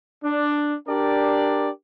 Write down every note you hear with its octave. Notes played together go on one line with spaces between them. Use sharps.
D4
D4 G4 A#4 D5